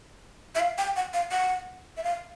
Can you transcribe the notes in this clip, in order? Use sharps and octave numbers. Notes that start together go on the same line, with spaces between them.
E5
F5
G5
F#5
F5
F#5
E5
F5